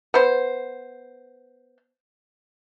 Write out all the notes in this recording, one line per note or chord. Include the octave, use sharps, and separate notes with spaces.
B3 C5